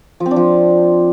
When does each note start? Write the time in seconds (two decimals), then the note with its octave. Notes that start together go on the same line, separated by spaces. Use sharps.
0.20 F3
0.26 C4
0.31 D4
0.36 F3